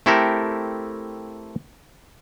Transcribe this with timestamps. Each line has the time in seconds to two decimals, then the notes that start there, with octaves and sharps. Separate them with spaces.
0.06 A3 C4 E4 G4 A4 A#4